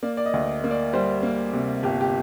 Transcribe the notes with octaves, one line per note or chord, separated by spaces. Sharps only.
A#3 D5
D5
D#5
D2
A#3
D5
G3 C5
A#3
C3
G1 G4
G4